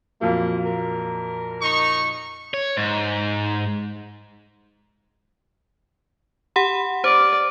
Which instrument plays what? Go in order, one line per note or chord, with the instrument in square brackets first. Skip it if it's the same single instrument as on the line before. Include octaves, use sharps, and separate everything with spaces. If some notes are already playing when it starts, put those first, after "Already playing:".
[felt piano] F2 A#2 F#3 [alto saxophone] A#3
[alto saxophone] A#4
[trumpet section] D#4 C#6
[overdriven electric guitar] C#5
G#2
[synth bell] G4 F#5 B5
[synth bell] C5 [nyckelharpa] D5